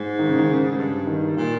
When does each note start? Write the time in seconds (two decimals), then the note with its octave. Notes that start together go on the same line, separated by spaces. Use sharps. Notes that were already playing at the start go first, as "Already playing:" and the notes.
Already playing: G#2
0.19 D#3
0.29 C#3
0.39 D#3
0.49 C#3
0.78 G2
1.07 D#3
1.37 A#2 D#3